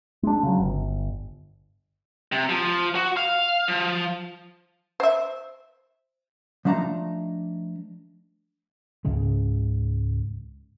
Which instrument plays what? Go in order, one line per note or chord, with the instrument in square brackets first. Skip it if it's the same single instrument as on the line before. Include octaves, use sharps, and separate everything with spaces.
[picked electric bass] G#3 D4
C#3 F#3
G1
[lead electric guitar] C3
F3
F#4
F5
F3
[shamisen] C5 E5
[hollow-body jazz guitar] F3 A3 D4 D#4 A#5
[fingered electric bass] C#2 G#2 C#3 G#3